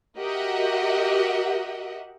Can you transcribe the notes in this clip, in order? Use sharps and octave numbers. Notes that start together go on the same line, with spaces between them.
F#4 G4 A#4 D#5 E5 F#5